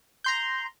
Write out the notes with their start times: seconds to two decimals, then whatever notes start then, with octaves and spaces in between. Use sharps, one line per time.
0.24 A#5 C6 G6